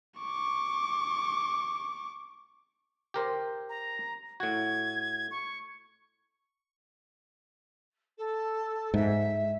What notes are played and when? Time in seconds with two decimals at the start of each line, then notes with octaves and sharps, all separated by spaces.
0.19 C#6 D6
3.14 G4 A#4 C5
3.69 A#5
4.40 A2 F#4 G#6
5.31 C#6
8.17 A4
8.94 G#2 E5